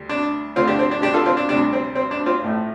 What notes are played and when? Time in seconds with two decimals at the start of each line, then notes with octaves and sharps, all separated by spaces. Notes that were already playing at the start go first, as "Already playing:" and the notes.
Already playing: D2 G3
0.09 D4
0.56 D2 D3 A3 C4 F4
0.67 D4 G4
0.79 C4
0.91 D4
1.02 D4 G4
1.14 F4 A4
1.25 C4 F4
1.37 D4
1.48 D2 C3 G3 D4
1.73 C4
1.95 C4
2.11 D4
2.26 C4 F4
2.42 A1 A2 A3